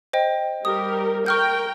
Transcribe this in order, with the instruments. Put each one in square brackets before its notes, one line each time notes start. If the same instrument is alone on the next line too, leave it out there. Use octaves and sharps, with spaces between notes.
[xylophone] C5 D#5 G5
[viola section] G3 G4 A#4 [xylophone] D#6
[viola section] A#4 G5 [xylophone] C#6 F6 G6